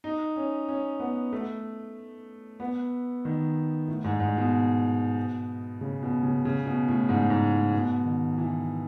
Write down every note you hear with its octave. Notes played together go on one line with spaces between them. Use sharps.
D#4
C#4
C#4
B3
A3
B3
D#3
A2
G#2
G#2
B2
C#3
B2
C#3
C#3
B2
A2
G#2
G#2
A2
B2
D#3
E3